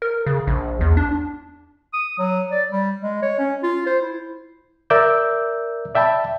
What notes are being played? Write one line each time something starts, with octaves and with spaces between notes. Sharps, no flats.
A#4
C#3
A#1
E2
D4
D#6
F#3
D5
G3
G#3
C#5
C#4
F4
C5
E4
A#4 D5 E5 D6 E6 G6
D5 E5 G5 A5 B5